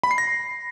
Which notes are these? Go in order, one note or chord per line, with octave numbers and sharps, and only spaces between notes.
B5
C7
A#6